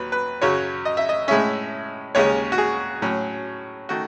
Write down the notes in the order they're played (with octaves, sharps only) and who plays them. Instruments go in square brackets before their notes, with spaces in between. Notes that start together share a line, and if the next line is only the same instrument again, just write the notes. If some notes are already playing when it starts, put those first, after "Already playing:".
Already playing: [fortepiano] D#2 F#3 B4
B4
F#2 C#3 F#3 C#5
D#5
E5
D#5
A2 G#3 C#4 E5
D#2 C#3 G#3 C#4 C#5
F#4
G#4
A2 F#3 C#4
D#3 A3 F#4